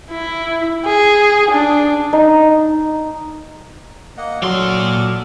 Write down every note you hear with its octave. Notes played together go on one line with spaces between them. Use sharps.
E4
G#4
D4
D#4
A#3 D#5 F#5
A#2 F#3 D4 F#4 A4 C6 F6